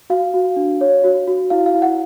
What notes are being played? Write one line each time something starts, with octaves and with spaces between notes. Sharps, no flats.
F#4 F5
F#4
D4
C#5
F#4
F#4
E4 F5
F5
E4
F#5